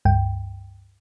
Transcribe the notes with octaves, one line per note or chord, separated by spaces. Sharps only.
C#2 G2 G5